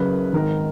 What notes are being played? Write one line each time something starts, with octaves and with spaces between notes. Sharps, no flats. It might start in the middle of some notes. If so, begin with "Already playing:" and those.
Already playing: F#1 F#2 C#3 B4
G#1 G#2 D#3 A#4